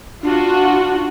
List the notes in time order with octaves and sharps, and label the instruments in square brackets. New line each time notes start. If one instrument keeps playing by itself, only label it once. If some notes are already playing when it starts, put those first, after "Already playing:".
[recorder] D4 [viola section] F4 F#4